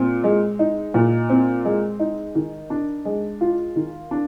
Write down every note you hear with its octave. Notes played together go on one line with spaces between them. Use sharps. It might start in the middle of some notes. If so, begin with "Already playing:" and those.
Already playing: A#2 C4
G#3
D#4
A#2
C4
G#3
D#4
D#3
D4
G#3
F4
D#3
D4